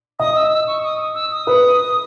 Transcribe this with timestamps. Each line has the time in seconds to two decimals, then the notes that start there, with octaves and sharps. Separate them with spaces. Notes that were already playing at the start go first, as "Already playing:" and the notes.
0.20 D#5 D#6
0.36 E6
0.52 E6
0.67 C#6
0.83 D#6
1.15 E6
1.32 D#6
1.47 B4